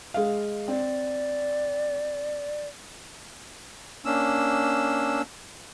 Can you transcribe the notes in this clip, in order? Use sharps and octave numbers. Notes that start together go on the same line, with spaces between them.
G#3 F5
C4 D5
A#3 C#4 D4 E6